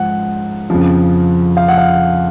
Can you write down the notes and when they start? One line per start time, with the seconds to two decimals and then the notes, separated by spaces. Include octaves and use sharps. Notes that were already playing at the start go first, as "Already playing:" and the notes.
Already playing: G#2 F3 F#5
0.70 F2 C#3 F3
1.57 F5
1.68 F#5
1.78 F5